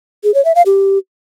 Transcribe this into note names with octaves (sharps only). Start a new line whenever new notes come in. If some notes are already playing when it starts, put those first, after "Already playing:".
G#4
C#5
E5
F5
G4